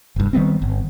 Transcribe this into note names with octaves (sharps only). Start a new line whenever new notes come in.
F1 G2
D#3 G3 B3 C4
G1